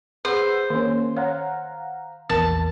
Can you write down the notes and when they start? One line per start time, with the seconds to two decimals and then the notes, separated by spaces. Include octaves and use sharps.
0.25 G#4 B4 C5 F#5 E6
0.70 D#3 A#3 C#4
1.17 C#5 F5 F#5 A#5
2.29 A#1 E2 A#4 A5